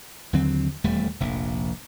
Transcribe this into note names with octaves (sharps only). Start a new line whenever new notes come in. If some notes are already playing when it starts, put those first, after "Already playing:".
D#2 D3 F#3 C4
D#1 E2 G3 A3
F1 A#1